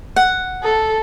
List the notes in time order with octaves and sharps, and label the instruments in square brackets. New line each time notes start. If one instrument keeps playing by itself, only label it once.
[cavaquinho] F#5
[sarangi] A4